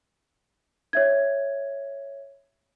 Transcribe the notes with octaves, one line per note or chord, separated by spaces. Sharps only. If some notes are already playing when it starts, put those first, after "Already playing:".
C#5 E5 G#6